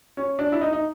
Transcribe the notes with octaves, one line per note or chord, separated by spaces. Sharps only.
C#4
D4
E4
D#4
D#4